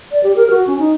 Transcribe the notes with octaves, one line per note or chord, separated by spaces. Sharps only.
D5
G4
A#4
F#4
C#4
D#4